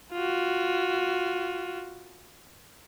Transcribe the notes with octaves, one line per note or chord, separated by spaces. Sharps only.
F4 F#4